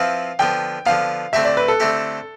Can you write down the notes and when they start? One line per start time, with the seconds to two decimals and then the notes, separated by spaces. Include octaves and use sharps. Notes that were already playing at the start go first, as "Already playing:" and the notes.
Already playing: F3 C4 E4 B4 F5
0.39 D3 F3 B3 G5
0.86 D3 F3 B3 F5
1.33 D3 A3 C4 E4 G4 E5
1.45 D5
1.57 B4
1.68 A4
1.80 D3 A3 C4 E4 G4